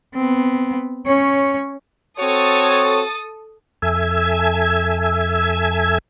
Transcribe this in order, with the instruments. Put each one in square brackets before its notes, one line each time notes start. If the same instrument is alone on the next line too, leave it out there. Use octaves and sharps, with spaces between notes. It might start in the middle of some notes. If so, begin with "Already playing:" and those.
[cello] B3 C4
C#4 C#5
[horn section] C4 F#4 C#5 [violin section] A4 D#6 A6
[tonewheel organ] F2 A4 E5 G#5 E6 G#6